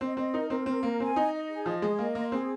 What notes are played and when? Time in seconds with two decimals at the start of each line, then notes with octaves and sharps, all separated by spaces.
0.01 C4 D#5
0.17 C4 D#5
0.33 D#4 A#4
0.50 C4 A#4
0.66 C4 A#4
0.83 A#3 A#4
1.00 C4 G#5
1.16 D#4 D#5
1.33 D#5
1.49 G#4
1.66 F3 D#5
1.82 G#3 G#4
1.99 A#3 D#5
2.15 A#3 C6
2.32 C4 G#4